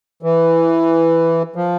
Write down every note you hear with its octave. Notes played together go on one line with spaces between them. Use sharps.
E3
F3